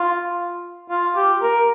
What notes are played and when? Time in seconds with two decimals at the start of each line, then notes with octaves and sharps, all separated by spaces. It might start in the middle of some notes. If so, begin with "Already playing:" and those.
Already playing: F4
0.90 F4
1.16 G4
1.42 A#4